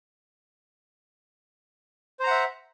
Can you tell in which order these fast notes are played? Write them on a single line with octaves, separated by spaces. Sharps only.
C5 A#5 F#5 E5